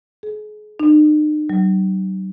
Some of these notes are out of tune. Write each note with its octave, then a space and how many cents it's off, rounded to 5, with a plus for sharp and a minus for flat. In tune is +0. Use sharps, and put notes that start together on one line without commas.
G#4 +35
D#4 -45
F#3 +45